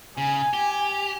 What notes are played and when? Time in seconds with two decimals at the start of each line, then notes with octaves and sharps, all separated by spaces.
0.18 C#3 G#5
0.53 G4